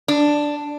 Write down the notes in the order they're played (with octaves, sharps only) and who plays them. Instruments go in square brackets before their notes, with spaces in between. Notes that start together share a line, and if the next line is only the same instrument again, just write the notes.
[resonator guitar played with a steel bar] D4